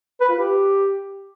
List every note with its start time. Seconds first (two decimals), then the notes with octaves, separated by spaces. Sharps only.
0.21 B4
0.29 F4
0.38 G4